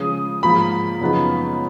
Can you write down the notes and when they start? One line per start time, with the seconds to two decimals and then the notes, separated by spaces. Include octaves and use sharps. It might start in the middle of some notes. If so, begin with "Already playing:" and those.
Already playing: C#3 F3 G#3 C#4 D#6
0.42 G#2 F3 A#3 B5
1.01 F#2 C#3 F3 B3 D#4